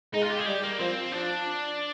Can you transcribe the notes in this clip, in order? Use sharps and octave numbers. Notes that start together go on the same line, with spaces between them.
G#3 D#4
F4
G4
G#4
G3 G4
A#3
F3 C4
F3 D4